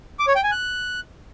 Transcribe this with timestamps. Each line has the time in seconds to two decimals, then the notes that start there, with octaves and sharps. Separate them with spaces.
0.19 D6
0.27 C#5
0.35 G5
0.43 G#5
0.52 F#6